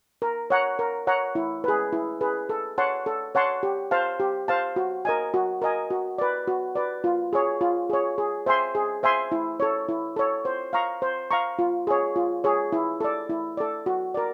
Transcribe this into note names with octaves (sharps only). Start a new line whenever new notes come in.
A#4
C#5 F#5 A#5
A#4
C#5 F#5 A#5
E4
G#4 B4
E4
G#4 B4
A4
C#5 F#5 A5 C6
A4
C#5 F#5 A5 C6
G4
C5 F5 A5
G4
C5 F5 A5
F#4
A#4 D#5 G#5
F#4
A#4 D#5 G#5
F#4
B4 D5
F#4
B4 D5
F4
G#4 C#5
F4
G#4 C#5
G#4
C5 E5 G#5 C6
G#4
C5 E5 G#5 C6
E4
A4 C#5
E4
A4 C#5
C5
F5 A#5 C#6
C5
F5 A#5 C#6
F4
G#4 C#5
F4
G#4 C#5
E4
A4 D5
E4
A4 D5
F#4
A#4 D5